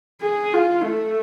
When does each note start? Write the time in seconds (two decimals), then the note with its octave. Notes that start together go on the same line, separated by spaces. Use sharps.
0.22 G#4
0.53 F4
0.85 A3